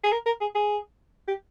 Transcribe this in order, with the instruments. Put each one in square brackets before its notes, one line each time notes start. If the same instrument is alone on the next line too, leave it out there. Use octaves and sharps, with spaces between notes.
[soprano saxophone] G#4
A#4
A#4
G#4
G#4
G4